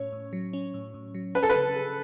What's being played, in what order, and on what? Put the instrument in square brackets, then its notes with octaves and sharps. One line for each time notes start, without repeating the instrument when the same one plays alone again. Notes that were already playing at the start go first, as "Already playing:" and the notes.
Already playing: [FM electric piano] A2 C#4 [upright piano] C#5
[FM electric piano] A2
F#3
C#4
A2
A2
F#3
[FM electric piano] C#4 [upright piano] B4
[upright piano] A4
B4
[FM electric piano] C#3
G#4